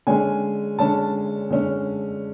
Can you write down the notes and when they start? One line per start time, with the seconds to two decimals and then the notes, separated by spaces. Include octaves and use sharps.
0.07 D3 G#3 C#4 G#5
0.79 D3 G#3 C#4 A5
1.50 D3 G#3 C#4